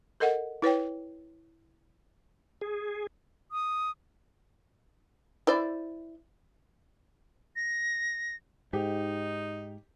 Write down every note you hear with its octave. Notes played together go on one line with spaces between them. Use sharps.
A4 A#4 D#5 F#5
E4 B4 C#5 G5
G#4
D#6
E4 C5 D5
A#6
G#2 D#4 G4